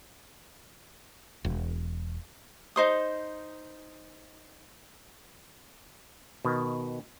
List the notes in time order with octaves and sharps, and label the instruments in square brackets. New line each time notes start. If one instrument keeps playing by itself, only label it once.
[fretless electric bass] E1
[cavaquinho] D#4 C5 D#6
[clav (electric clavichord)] B2 D#3